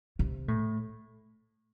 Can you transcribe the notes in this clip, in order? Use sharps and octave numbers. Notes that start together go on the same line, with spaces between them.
C3
A2